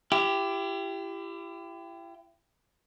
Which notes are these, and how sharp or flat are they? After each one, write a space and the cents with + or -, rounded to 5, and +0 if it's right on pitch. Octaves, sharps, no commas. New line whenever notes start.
E4 +40 G4 +0